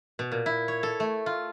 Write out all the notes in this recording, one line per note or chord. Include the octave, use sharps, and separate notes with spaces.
B2
A#2
E4
C#5
A4
A3
F4